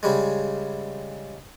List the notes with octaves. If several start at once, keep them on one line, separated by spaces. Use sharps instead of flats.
C#3 G3 G#3